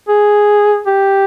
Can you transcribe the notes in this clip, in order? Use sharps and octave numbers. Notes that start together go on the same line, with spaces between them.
G#4
G4